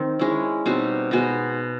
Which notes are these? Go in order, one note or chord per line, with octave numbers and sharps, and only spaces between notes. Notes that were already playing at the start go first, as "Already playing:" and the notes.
Already playing: D#3 C4
G#3 C#4 E4
B2 G3 C4 D#4
B2 G#3 B3 D#4